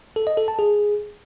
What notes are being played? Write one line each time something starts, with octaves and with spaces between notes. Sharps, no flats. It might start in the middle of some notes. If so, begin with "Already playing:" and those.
A4
D#5
A4
A5
G#4